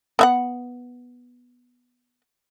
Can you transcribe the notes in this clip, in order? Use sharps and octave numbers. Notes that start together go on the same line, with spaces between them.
B3 E5 F#5